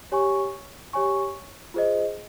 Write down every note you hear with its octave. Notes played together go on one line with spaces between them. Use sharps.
G4 C#5 G#5 C#6
G4 C#5 G#5 C#6
F4 G#4 C5 D#5